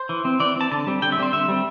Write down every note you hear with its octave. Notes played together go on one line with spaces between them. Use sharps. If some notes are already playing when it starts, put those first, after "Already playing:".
Already playing: C5
E3
C4
E3 D5
C4 A5
D3 A5
G3 C4
D3 G5
E5
G3 C4 C5
D3 E5
G3 C4